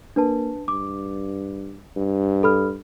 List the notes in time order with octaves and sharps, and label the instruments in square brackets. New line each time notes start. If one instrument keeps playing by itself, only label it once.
[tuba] A#3 [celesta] D4 B4 A5
[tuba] G2 [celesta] D6
[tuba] G2
[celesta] A4 B5 F6